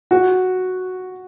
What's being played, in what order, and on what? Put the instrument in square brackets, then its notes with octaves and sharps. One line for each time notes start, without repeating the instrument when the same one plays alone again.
[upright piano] F#4